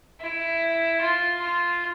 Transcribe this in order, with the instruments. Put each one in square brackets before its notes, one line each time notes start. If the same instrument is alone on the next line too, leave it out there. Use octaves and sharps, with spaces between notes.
[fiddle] E4
F4
F4